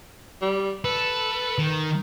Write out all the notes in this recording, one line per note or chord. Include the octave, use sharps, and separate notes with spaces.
G3
A4 B4
D#3